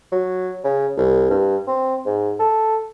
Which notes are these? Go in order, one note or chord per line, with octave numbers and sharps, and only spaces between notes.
F#3
C#3
C2
G2
C4
G#2
A4